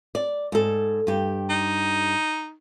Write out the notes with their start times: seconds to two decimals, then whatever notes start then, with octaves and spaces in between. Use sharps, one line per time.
0.15 D5
0.52 G#2 A4
1.07 G2 G4
1.49 D#4